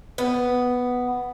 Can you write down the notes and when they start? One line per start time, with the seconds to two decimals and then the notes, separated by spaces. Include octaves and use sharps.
0.18 B3